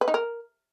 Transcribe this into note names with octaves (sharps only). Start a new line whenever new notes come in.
B4
D#4
A#4